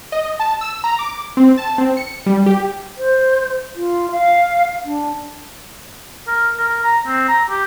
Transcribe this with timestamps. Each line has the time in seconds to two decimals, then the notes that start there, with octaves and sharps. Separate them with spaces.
0.12 D#5
0.40 A5
0.61 E6
0.84 A#5
0.99 D6
1.37 C4
1.58 A5
1.78 C4
1.97 C#7
2.26 G3
2.46 G4
2.98 C5
3.75 F4
4.11 F5
4.84 D4
6.27 A#4
6.59 A#4
6.83 A#5
7.07 C4
7.28 A#5
7.50 G4